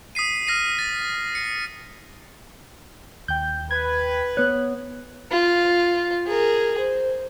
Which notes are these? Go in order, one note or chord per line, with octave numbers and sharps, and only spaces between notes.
D#6 B6 C7 D#7
F6 A#6 C7 D#7
A6
C#7
D#2 G5 G6
B4 G#6
B3 C#5 F#6
F4
G#4 A#4
C5